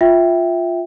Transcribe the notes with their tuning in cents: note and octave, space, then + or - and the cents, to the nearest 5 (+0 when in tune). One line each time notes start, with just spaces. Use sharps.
F4 +0 E5 +0 G5 +0